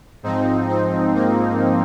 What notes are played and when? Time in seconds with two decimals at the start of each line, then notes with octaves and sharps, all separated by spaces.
0.23 G#2 F3 C4 D#4
0.69 C4
1.14 A#3